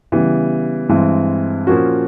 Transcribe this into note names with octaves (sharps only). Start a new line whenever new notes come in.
C#3 E3 G3 B3
G2 E3 G#3 C4
A#2 F3 A#3 C#4 F#4